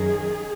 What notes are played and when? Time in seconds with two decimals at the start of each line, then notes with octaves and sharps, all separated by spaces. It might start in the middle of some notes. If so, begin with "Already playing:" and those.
Already playing: F#2 D#3 G#4